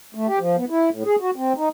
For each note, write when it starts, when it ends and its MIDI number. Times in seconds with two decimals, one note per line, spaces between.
0.15 0.27 57
0.28 0.39 67
0.39 0.56 53
0.57 0.65 59
0.70 0.90 64
0.90 1.03 45
1.05 1.16 68
1.20 1.31 66
1.36 1.53 60
1.57 1.69 63